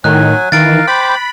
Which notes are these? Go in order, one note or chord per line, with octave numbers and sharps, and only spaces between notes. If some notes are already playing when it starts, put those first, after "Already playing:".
A2 D#3 F#3 G#5 F#6
D#3 E3 A#4 F5 A6 D7
C5 G5 B5 D6